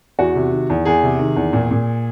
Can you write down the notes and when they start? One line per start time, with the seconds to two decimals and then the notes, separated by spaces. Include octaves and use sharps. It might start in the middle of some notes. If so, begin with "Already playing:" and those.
0.19 E2 F#4
0.36 C3
0.52 D#3
0.70 E2
0.85 E2 G#4
1.03 C3
1.19 D#3
1.36 E2
1.53 A#2
1.71 A#2